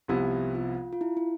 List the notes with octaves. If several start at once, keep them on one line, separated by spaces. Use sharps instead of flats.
C2 C3 F3 B3 E4 G4
F4
F4
E4
E4